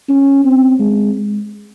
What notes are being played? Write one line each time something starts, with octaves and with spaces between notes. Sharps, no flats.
C#4
C4
G#3